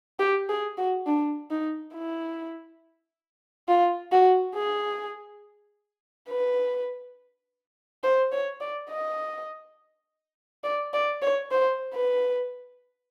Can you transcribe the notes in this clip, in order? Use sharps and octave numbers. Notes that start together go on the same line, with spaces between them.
G4
G#4
F#4
D4
D#4
E4
F4
F#4
G#4
B4
C5
C#5
D5
D#5
D5
D5
C#5
C5
B4